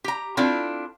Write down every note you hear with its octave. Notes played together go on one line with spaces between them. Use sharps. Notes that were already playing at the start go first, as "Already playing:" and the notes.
G4 A#5
C4 D4 E4 F4 A4